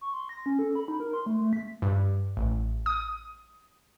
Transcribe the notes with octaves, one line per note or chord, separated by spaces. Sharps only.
C#6
C6
A#6
C#4
A4
B5
D#4
A#4
C6
A3
A3
B6
G2
A1
D#6